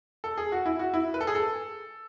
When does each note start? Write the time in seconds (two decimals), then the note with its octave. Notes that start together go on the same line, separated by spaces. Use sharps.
0.24 A4
0.38 G#4
0.52 F#4
0.66 E4
0.79 F#4
0.94 E4
1.14 B4
1.21 A4
1.27 G#4
1.35 A4